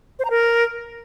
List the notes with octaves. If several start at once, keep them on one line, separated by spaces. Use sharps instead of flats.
C5
A#5
A#4